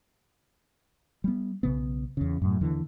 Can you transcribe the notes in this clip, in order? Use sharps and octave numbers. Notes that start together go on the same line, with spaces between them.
G3 B3
B1 C#3 B3
E2 C#3
F#2 A2
D#2 D3 E3